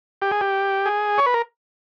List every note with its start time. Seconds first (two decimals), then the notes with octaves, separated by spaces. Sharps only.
0.22 G4
0.31 G#4
0.41 G4
0.86 G#4
1.18 C#5
1.26 B4
1.34 A#4